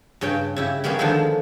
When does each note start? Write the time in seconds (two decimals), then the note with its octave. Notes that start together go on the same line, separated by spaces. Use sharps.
0.21 G2 C#3 C#4 G5
0.56 C#3 E4 G4
0.84 G3 A#3 B3 C#4 G#4
0.99 D3 D#3 F3 G#3 D#4 A4